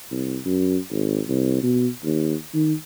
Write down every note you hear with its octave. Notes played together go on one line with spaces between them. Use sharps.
C2
F#2
G#1
C2
B2
D#2
D#3